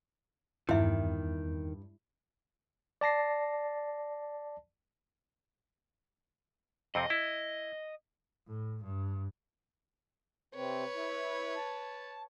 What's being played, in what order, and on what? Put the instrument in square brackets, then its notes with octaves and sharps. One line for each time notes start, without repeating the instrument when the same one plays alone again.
[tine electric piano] E2 [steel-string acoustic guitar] G2 [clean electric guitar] D#3 [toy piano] E4 E5
[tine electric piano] D5 A5 A#6 C7
[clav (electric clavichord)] F2 C3 C4 [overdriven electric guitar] D#5
[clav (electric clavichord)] E4
[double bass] A2
G2
[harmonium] C3 C4 [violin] B4 C#5
[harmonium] E4
A5